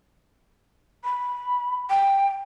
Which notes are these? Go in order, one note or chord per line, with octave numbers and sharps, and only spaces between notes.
B5
G5